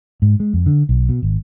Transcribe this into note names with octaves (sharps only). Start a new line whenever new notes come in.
G#2
G#3
F2
D3
B1
B2
G#1